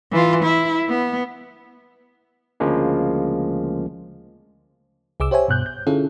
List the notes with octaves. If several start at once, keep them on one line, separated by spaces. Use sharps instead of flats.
E3 F4
E4
B3
D2 C#3 F3 G#3 A#3
C2 G#4 D6 E6
G4 C5 C#5 E5 G#5
G2 B2 F#6 G6
G6
D3 C#4 E4 F4 G#4 A4